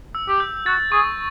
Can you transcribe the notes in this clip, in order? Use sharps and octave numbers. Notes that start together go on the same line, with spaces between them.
E6
G4
G6
F#4 A6
G#4 C#6